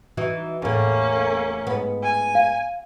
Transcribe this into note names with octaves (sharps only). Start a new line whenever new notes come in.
E3 D#4 F#4
E2 A2 A#3 C#4
G#2 B3
G#5
F5